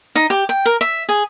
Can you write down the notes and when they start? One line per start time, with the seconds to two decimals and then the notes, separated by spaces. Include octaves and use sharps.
0.15 D#4
0.30 G4
0.49 G5
0.66 A#4
0.81 E5
1.09 G#4